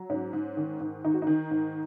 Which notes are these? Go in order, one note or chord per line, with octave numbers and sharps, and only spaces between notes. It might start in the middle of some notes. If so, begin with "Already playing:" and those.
Already playing: F#3
G#2 C#4
G#2
D#3
G#2
D#3 D#4
F#4
D#3 D#4
G#2